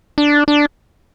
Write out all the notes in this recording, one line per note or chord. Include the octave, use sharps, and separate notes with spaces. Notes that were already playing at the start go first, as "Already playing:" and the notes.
D4
D4